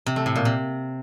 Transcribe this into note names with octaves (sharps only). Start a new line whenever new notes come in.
C3
A3
A2
A#2
C3